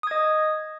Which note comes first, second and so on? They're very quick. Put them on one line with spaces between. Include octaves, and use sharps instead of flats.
D#6 G#6 D#5